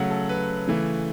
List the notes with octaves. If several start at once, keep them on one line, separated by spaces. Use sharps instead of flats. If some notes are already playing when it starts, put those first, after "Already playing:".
Already playing: C#3 F#3 A3 F#5
A4
B4
C#3 E3 A3